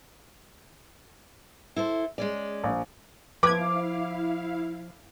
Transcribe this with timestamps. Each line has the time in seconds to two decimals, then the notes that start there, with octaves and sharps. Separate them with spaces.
1.76 E4 A4 C5
2.18 G#3 C#4 D5
2.64 A#1
3.43 F3 E4 B4 F5 D6 G#6